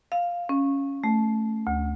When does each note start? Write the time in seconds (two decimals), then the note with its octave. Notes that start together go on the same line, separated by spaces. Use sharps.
0.12 F5
0.49 C#4
1.04 A3
1.67 D2